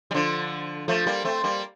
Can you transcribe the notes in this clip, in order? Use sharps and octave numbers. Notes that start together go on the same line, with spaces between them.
G3
D3 F3
F3 A3
G3 A#3
A3 C4
G3 A#3